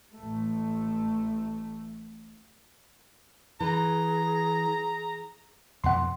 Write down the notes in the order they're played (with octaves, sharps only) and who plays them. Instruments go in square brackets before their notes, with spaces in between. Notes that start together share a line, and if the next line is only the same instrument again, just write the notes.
[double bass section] A1 A3
[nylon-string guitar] E3 [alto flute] G#4 [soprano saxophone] A#5
[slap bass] F2 B2 B3 [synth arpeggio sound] F#5 C6